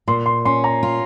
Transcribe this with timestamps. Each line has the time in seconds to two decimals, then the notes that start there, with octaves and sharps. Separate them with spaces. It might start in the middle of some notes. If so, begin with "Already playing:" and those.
0.08 A#2 C6
0.26 C6
0.45 C#4 C6
0.64 A#5
0.83 F4